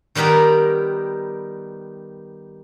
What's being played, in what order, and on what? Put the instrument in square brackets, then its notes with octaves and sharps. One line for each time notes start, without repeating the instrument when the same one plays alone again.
[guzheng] D#3 G3 B3 G4 A#4